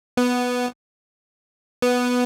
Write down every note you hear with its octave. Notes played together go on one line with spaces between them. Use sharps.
B3
B3